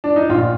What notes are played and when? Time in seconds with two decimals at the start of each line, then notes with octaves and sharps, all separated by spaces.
0.04 D4
0.16 D#4
0.29 A#1 A#2 F4